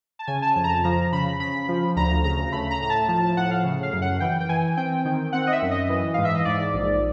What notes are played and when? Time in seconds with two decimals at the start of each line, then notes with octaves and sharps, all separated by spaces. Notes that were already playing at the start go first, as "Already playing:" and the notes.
0.19 A5
0.27 C#3 G#5
0.42 A5
0.56 F2 A5
0.64 A#5
0.69 A5
0.84 F3 A#5
1.12 C#3 B5
1.40 C#3 B5
1.68 F3
1.96 D2 A#5
2.24 C#3 A#5
2.52 A3 B5
2.70 A#5
2.81 A2 A#5
2.90 A5
3.08 F3 A5
3.23 A5
3.37 A2 F#5
3.51 F5
3.64 C#3
3.83 F5
3.93 F#2
4.02 F#5
4.20 E3 G5
4.40 G5
4.49 E3 G#5
4.77 C4 G5
5.05 D#3
5.33 C4 F#5
5.47 D#5
5.52 E5
5.62 F#2
5.71 D#5
5.89 E3
6.14 G#2 F5
6.25 E5
6.35 D#5
6.45 G#2 D5
6.73 A#1